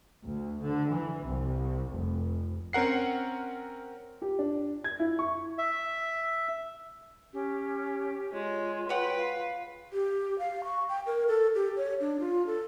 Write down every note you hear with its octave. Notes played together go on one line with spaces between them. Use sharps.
D2
D3
E3
C2
F1
C4 C#4 A#4 F#5 C7
G4
D4
G#6
E4
C#6
E5
C#4 G4
G#3 F4 C#5
F#4 B4 C#5 F#5 G5
F5
G4
F5
C#6
G5
A#4
A4
G4
C#5
D4
F4
A4